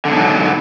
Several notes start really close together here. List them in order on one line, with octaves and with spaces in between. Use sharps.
D3 E2 G#2 B2 F#3